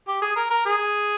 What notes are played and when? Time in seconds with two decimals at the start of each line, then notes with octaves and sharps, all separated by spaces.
0.08 G4
0.22 G#4
0.36 A#4
0.50 A#4
0.65 G#4